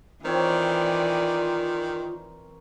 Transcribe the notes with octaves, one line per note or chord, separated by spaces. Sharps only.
D#3 E3 C4 F4 A#4 C#5 D5